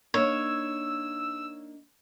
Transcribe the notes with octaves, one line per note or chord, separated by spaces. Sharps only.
A#3 D4 D#4 C#5 E6